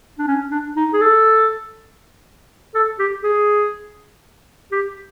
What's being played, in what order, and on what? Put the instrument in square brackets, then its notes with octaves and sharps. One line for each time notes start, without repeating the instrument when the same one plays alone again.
[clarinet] D4
C#4
D4
D#4
G#4
A4
A4
G4
G#4
G4